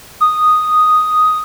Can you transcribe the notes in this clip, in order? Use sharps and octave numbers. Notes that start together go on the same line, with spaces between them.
D#6